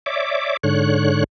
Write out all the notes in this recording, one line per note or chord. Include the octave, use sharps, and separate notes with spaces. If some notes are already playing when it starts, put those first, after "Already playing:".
C#5 D5 E5 D6
G#2 D3 C#5 F#6